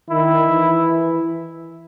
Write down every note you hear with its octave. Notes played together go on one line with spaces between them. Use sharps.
D#3 E4
E3